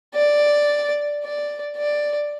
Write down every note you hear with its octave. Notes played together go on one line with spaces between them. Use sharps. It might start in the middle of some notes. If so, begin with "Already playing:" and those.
D5
D5
D5